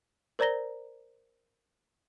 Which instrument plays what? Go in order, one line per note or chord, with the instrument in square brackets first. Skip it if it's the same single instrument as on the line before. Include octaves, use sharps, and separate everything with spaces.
[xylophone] A#4 C5 D5 A#5 A#6 G7